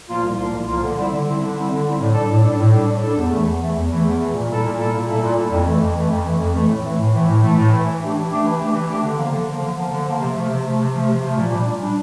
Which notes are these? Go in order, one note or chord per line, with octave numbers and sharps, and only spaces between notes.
A#2 F3 A#3 F4
C2
A#2 F3 A#3 F4
C2
A#2 F3 A#3 F4
D3
G3 C4 E4
D3
G3 C4 E4
D3
G3 C4 E4
D3
G3 C4 E4
A2
G3 D4 A4
A2
G3 D4 A4
A2
G3 D4 A4
A2
G3 D4 A4
E2
E3 A3
E2
E3 A3
E2
E3 A3
E2
E3 A3
A#2
G3 A#3 E4 A4
A#2
G3 A#3 E4 A4
A#2
G3 A#3 E4 A4
A#2
G3 A#3 E4 A4
F2
E3 A3
F2
E3 A3
F2
E3 A3
F2
E3 A3
A2
E3 A3
A2
E3 A3
A2
E3 A3
A2
E3 A3
E3
A3 D4 G4
E3
A3 D4 G4
E3
A3 D4 G4
E3
A3 D4 G4
D3
F3 A#3
D3
F3 A#3
D3
F3 A#3
D3
F3 A#3
C3
F3 A3
C3
F3 A3
C3
F3 A3
C3
F3
A3
A#2
G3 D4
A#2
G3 D4